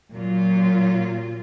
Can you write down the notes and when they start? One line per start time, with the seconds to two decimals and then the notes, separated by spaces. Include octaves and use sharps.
0.12 A#2 F#3 F4